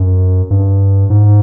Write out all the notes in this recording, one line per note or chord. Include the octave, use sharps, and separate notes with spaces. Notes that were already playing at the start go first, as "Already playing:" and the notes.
Already playing: F#2
G2
G#2